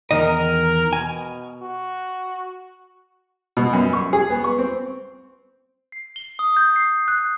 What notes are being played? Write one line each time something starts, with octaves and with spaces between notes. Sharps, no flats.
E2 D#3 A#4 D#5
B2 G#5
F#4
B2
F#2
C#6
G#4
B3
C#6
C4
C7
G7
D#6
G6
C7
F#6